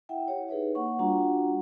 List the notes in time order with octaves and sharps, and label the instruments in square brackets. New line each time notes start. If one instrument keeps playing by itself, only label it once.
[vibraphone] E4 E5 F#5 G5
G4 C#5
D#4 G#4 B4 C#5 E5
A#3 F#5 C#6
G3 D4 F4 F#4 F#5 A#5